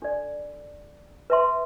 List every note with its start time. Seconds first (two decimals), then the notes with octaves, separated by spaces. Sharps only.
0.02 D4 A4 D5
1.30 B4 E5 A5 C6